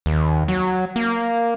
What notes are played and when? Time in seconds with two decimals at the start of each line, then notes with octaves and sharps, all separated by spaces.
0.06 D#2
0.48 F#3
0.96 A#3